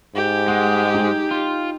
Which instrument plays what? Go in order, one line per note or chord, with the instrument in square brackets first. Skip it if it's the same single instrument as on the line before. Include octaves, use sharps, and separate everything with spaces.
[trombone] G#2 [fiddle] G4
[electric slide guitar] G#3 [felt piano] F#5
[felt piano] D#4 G5
[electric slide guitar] F4